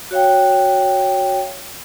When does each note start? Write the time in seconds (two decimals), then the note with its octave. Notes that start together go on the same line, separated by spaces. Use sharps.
0.11 F#4 C#5 F5 G5